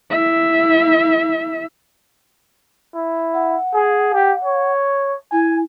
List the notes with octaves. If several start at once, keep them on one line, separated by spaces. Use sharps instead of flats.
E4 E5
E4
F#5
G#4
G4
C#5
E4 G#5